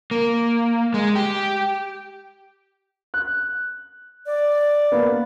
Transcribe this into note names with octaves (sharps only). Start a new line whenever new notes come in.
A#3
G#3
G4
F#6
D5
A#3 B3